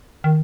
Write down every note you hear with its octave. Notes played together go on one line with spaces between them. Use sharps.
D#3